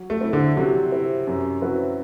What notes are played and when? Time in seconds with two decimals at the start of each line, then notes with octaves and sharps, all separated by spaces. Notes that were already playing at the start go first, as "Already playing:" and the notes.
Already playing: F#3
0.10 A3
0.21 C4 E4
0.33 D3
0.57 C3 F#3
0.92 C4 E4
1.27 F#2
1.62 F#3 C4 E4 B4